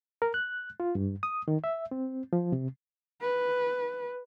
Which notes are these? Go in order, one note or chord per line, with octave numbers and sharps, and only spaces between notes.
A#4
F#6
F4
G2
D#6
D#3
E5
C4
F3
C3
B4